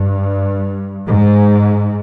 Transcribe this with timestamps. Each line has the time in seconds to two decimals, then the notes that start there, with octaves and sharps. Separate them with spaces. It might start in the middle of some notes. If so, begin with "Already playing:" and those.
Already playing: G2
1.07 G#2